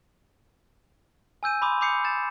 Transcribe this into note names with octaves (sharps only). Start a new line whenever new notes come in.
G#5 E6 G6 D#7
B5 C6 D6 D#6
B5 D6 D#6 G6 C7 C#7
G6 A6 E7